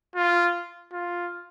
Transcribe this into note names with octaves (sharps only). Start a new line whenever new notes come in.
F4
F4